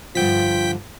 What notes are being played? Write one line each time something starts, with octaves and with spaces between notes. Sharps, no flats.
G2 D3 F3 F4 G5 B6